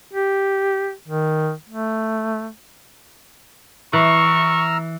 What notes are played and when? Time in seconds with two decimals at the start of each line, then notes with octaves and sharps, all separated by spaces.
0.13 G4
1.08 D#3
1.69 A3
3.93 E3 A#5 C#6 E6 F6